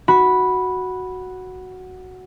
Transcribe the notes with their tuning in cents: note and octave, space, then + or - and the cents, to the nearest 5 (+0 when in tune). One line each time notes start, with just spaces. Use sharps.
F#4 +0 B5 -5